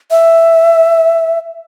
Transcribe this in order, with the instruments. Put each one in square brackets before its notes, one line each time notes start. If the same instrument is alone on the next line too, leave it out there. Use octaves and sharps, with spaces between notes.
[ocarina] E5